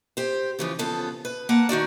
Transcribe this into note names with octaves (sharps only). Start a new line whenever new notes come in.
G4 C5
C#3 E3 F3
C#3 F3 B3 A4
B4
A#3 B4 F#5 A5
D#3 D#4 F#4 D5